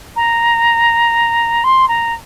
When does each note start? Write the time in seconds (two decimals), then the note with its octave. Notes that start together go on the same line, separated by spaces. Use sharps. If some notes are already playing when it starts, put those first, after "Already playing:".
0.16 A#5
1.64 C6
1.88 A#5